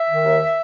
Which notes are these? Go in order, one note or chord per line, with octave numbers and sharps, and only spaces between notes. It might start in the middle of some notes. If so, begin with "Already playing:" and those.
Already playing: E5
D#3
D#2